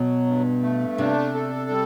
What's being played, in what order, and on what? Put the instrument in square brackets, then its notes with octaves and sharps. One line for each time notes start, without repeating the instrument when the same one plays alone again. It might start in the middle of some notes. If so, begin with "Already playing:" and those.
Already playing: [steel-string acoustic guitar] B2 [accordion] F#3
[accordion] G2
A3
[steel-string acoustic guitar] C3 [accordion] D4
[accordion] A4
G3